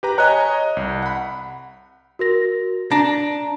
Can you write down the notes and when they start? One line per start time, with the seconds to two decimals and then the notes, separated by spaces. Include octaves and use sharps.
0.03 G4 B4 A#5
0.18 C#5 D#5 G#5 A#5 F#6
0.77 C2
1.02 F#5 B5
2.19 F#4 A#4 A#6
2.91 D4 A5 A#5 A#6